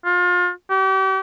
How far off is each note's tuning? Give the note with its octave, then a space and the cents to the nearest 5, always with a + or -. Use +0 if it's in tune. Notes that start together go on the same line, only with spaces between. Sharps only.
F4 +30
G4 -40